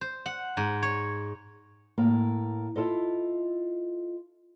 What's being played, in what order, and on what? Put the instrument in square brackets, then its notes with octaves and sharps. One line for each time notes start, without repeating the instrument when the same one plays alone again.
[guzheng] C5
F#5
G#2
C#5
[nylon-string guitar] A2 A#3
E4 F4 A4 D#5